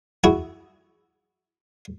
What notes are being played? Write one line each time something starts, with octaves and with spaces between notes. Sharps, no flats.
E4 F#4 G#4